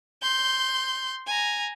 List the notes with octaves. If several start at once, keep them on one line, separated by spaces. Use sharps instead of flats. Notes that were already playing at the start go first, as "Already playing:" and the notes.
C6 G6
G#5 A#5